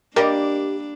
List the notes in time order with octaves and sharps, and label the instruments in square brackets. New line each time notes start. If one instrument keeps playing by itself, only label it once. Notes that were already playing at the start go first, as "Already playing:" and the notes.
[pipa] G3 A#3 [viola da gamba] D4 [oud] G4 D5 D#5 [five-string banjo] A#4